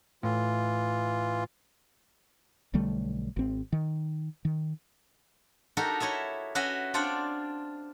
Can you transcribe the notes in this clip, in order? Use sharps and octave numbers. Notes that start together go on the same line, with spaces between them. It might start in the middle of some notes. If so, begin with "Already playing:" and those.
A2 E3 F4
B1 D3 G3 A3
G#1 C4
D#3
D#3
D#4 F#4 G4 A4 A#4
E4 C#5 D#5 E5
C#4 F#4 B4 D#5 E5 B5
C4 D4 F4 D5 F#5 G5